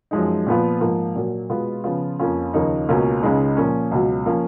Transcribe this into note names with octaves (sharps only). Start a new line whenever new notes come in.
F#2 F3 G#3 D#4
A#2 F3 B3 F4
G#2 F3 A#3 F4
A#2 F#3 A#3
B2 G#3 B3 F4
C#3 F3 B3 F4
F2 F3 A#3 C#4 F4
D#2 C#3 F3 A#3 D#4
C#2 B2 A#3 C#4 F4
C#2 C#3 G#3 D#4
A#2 F3 A#3 C#4
C#2 B2 F#3
F3 A#3 C#4 F4